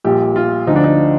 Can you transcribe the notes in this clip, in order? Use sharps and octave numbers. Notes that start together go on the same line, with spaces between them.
A#1 A#2 G3 G4
F4
D2 D3 F3 D#4
D4
D#4